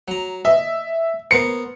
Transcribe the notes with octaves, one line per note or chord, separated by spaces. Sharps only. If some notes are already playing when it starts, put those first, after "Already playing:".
F#3 A#5
D#5 E5
B3 A#4 C5 C#7